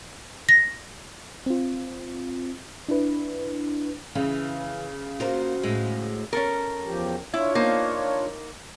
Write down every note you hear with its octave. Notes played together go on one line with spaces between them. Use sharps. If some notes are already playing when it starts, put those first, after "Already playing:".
A#6
C4 F4
D4 E4 B4
C#3 E3
A#3 F4 F#4 C5
A2 G#3
C#4 A4 A#4
E2 F3 G4
D4 E4 F4 C#5
A#3 D#4 C5